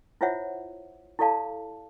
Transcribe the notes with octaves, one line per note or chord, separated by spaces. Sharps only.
E4 F4 C5 C#5 E5 F#5
E4 G4 A4 D5 F5 A5